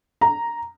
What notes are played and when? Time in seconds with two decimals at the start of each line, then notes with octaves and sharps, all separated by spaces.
0.21 A#5